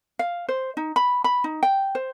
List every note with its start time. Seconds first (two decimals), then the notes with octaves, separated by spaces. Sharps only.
0.19 F5
0.49 C5
0.77 D#4
0.96 B5
1.24 B5
1.44 D#4
1.63 G5
1.95 C5